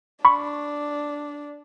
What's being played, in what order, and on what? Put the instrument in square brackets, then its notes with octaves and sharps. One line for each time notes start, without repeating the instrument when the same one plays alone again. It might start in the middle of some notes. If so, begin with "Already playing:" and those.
[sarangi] D4 [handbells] B5 C#6